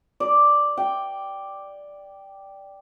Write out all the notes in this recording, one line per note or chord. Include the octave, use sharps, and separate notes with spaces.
D5
G5